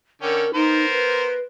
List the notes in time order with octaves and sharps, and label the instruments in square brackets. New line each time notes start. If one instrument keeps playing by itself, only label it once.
[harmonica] D3 C#4 G5 [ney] A#4
[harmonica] B3 A#4 C5 [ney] D#4
[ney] B4